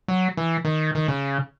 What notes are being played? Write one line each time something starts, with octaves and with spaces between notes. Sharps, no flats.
F#3
E3
D#3
D#3
C#3